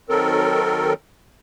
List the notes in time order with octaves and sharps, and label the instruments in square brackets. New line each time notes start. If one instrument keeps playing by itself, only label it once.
[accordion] D#3 F#3 C4 A4 A#4